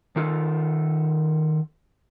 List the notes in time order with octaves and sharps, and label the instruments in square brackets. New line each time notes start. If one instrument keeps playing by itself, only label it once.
[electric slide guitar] D#3 F4 A4